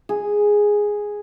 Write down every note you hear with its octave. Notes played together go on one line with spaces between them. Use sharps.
G#4